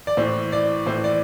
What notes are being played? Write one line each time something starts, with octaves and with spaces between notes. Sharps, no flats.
D5
A2 E3 C5
D5
A2 E3 C5
D5